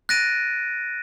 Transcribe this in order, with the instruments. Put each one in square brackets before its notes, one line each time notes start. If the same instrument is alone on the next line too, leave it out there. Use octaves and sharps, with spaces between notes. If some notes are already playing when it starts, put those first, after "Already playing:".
[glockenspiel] F#6 A6 A#6 D7 D#7